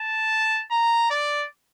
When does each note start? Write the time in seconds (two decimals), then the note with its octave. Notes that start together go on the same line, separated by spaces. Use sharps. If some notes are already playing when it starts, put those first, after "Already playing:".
Already playing: A5
0.71 A#5
1.10 D5